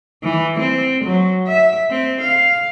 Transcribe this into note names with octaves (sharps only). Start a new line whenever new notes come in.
E3
C4
F#3
E5
C4
F5